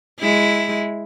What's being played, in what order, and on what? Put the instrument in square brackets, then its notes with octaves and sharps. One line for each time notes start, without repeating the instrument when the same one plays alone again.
[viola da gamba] G#3 E4